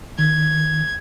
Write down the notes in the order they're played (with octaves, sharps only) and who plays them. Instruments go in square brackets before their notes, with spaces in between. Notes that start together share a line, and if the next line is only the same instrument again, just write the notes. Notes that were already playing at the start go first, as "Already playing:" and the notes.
[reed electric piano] D#3 [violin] G#6